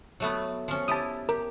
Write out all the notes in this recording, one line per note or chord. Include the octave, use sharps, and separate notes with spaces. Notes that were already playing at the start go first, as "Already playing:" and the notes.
F#3 A3 B3
F3 C#4
E4 G4 A5 D#6
G4 A#4